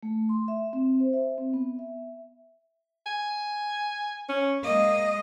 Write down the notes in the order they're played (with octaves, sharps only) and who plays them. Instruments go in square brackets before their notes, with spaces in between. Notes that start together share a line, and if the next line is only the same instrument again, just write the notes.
[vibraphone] A3
C6
E5
C4
C5
E5
C4
B3
E5
[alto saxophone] G#5
C#4
[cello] G#3 D#5 [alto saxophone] A#3